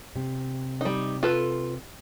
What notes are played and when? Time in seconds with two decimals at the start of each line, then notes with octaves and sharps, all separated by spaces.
0.16 C3
0.81 G3 D#4
1.23 F4 A4 B4